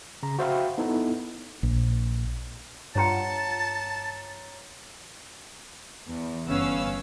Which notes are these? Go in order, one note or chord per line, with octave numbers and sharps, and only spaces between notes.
C#3 A#5
F#4 C5 E5 F5 G5 B5
B3 D#4 E4 A4
A#1
G2 F4 C#5 F#5 A5 A#5 C#7
E2
G1 B3 C#4 F5 E6